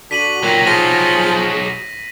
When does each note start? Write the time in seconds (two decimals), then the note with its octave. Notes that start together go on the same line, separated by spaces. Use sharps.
0.11 D3 F#4 B6 D#7 F#7
0.43 A#2 F#3 D#4 G5
0.67 F3 G#4 A#6